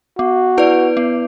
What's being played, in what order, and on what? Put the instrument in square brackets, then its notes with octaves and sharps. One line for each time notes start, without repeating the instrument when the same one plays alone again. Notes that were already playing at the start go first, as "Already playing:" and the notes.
[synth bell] B3 [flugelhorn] F#4
[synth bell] E4 B4 D5
B3